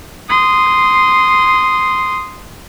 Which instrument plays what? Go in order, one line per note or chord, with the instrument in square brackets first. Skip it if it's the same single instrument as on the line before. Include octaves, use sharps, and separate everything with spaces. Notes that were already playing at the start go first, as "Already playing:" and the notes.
[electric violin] C6 D#6